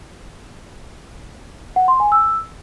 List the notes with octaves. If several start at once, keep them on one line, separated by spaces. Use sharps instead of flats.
F#5
C6
G#5
E6